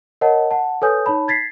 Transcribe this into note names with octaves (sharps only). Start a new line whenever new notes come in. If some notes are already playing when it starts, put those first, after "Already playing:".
A#4 C#5 D#5 F#5 A5
F#5 A5
A4 B4 C#5 G#5 D#6 G6
D#4 C#5 A5 B5
G#6 A6 B6 C7